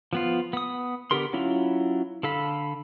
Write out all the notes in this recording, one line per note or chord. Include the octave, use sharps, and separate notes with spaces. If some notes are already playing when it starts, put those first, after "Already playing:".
F3 B3 F4
B3 D#6
D3 B3 G4 A#4 C6
F#3 C#4 E4 F4
D3 A4 F5 B5